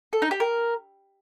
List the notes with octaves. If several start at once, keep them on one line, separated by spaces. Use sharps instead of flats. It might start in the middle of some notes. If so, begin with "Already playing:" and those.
A4
D#4
G4
A#4